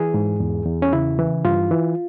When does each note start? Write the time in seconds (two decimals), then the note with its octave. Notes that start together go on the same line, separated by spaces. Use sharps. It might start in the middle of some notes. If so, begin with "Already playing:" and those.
Already playing: E3 G#4
0.14 G#2
0.40 E2
0.66 E2
0.82 C#4
0.93 C#3 E4
1.19 E3
1.45 G2 F4
1.71 E3